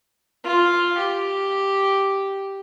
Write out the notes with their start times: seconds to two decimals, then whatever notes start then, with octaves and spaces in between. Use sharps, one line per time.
0.44 F4
0.98 G4